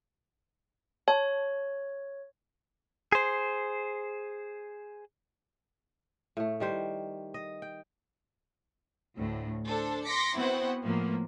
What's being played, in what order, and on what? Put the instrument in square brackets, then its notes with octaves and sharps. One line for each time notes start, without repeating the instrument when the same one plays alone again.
[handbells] C#5 [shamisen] A5
[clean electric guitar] G#4 C5
[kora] A2 A3
D#3 G3 C5
D#5
G5
[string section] D2 A2
D4 A4 C5
C6 D6 A#6 B6 C#7
B3 C4 E4 F#4 C5 F#5
A2 F3 A#3 B3